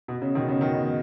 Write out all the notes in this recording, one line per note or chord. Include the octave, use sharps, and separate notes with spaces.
B2
C#3
B2 D#3
C#3
B2 D#3